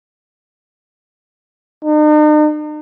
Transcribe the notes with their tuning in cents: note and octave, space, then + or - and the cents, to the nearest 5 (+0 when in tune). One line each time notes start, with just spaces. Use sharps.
D#4 -45